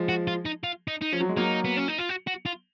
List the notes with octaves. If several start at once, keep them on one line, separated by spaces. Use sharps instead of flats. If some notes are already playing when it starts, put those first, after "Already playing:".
Already playing: F3 G#3
F#4
F4
D#4
F4
D#4
D#4
F3 C#4
F#3
G#3
F#3 A#3 D#4
B3
C#4
D#4
F4
F#4
F#4
F4